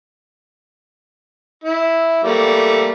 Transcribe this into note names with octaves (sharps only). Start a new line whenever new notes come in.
E4
G3 A3 A#3